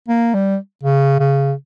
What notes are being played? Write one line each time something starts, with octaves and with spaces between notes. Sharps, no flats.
A#3
G3
C#3
C#3